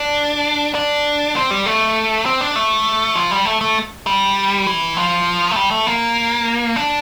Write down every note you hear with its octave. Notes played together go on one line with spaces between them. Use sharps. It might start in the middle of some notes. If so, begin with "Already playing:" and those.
Already playing: D4
D4
C4
G3
A3
C4
D4
A3
F3
G3
A3
A3
G3
E3
F3
A3
G3
A3
A#3
D4